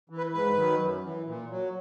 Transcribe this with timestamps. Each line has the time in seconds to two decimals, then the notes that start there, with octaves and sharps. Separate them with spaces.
0.10 E3
0.17 B4
0.33 G#2 B4
0.56 D#3 F#3
0.80 F#2
1.04 E3
1.26 A#2
1.50 F#3